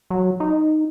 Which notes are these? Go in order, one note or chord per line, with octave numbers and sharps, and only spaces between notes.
F#3
D#4